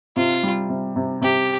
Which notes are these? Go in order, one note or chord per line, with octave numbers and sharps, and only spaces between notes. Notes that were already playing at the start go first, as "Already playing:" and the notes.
C3 F4
G3
C3
C3
C3 G4